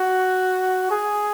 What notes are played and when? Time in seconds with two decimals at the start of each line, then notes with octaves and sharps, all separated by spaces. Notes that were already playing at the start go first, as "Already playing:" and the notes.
Already playing: F#4
0.91 G#4